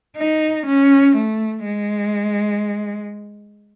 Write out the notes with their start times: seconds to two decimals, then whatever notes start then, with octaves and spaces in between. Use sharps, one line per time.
0.17 D#4
0.66 C#4
1.16 A3
1.65 G#3